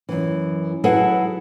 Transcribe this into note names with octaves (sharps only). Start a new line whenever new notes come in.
F#2 E3
F#3 E4 G#4 A4 B4 F#5